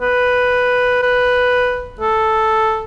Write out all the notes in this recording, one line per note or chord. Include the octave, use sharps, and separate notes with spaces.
B4
B4
A4